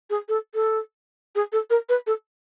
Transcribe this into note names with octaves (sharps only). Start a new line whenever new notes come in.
G#4
A4
A4
G#4
A4
A#4
B4
A4